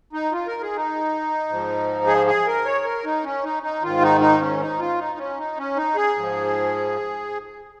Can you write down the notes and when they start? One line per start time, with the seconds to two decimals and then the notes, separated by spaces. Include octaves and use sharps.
0.13 D#4
0.32 F4
0.47 A#4
0.62 G#4
0.76 D#4
1.49 G#2 F3
2.07 G#4
2.27 G#4
2.47 A#4
2.65 C#5
2.85 A#4
3.04 D#4
3.24 C#4
3.44 D#4
3.63 D#4
3.82 G#2 D#3 F4
4.02 D#4
4.21 D#4
4.41 C#4
4.60 D#4
4.79 F4
4.99 D#4
5.18 C#4
5.38 D#4
5.57 C#4
5.76 D#4
5.95 G#4
6.16 G#2 F3